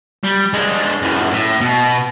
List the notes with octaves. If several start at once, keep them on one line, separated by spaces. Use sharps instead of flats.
G3
G#3 D4
F#2 E3
A2
B2